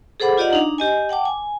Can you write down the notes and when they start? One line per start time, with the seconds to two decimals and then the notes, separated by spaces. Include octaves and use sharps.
0.20 G#4 A4 C5 F#5 B5 D6
0.38 F4 G4 D5 D#5 F5 F#5
0.50 D4 D#4 A#5
0.78 G4 D#5 G#5
1.09 F#5 G5 A5 D6
1.25 G#5